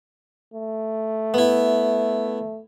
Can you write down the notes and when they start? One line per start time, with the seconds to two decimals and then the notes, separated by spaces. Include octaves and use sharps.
0.54 A3
1.34 B3 E4